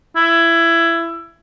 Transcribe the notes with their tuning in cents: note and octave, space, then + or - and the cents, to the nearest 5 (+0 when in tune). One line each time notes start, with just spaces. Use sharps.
E4 +20